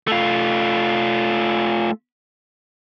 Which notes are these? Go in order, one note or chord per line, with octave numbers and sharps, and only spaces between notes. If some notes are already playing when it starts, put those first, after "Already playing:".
A3 F4